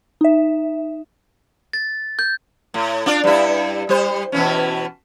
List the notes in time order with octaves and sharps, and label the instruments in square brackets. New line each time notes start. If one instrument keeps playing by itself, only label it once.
[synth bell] D#4 E5
[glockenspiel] A6
G6
[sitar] A2
D4 F4 D5
G2 E4
G3 C5
B2 E3 C#4